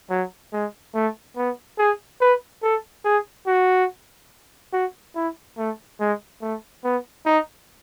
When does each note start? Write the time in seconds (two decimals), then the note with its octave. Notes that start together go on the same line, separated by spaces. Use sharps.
0.10 F#3
0.52 G#3
0.94 A3
1.37 B3
1.78 G#4
2.21 B4
2.63 A4
3.05 G#4
3.47 F#4
4.73 F#4
5.15 E4
5.57 A3
6.00 G#3
6.42 A3
6.84 B3
7.26 D#4